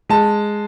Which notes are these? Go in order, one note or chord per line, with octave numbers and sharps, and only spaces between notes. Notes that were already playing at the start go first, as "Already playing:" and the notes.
G#3 A5